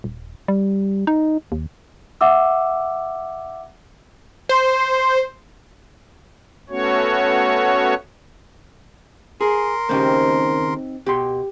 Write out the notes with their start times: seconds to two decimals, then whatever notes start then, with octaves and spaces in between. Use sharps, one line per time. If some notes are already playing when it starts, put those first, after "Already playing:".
0.04 D#1
0.48 G3
1.07 D#4
1.52 D#2
2.21 E5 F#5 D6 E6
4.49 C5
6.70 A3 B3 C#4 F#4 C#5
9.41 G#4 A#4 C6
9.89 D#2 C#3 A#3 C4 D#4 G4
11.06 B2 G4 C6